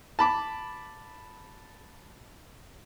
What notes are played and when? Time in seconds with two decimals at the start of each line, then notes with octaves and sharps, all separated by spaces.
0.19 A5 B5 D6